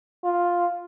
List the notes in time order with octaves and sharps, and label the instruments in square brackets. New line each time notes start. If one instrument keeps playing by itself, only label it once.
[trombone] F4